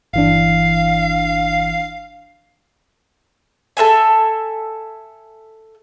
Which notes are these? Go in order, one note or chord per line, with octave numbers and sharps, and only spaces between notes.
G1 E3 D4 F5
A4 B4 E5 G#5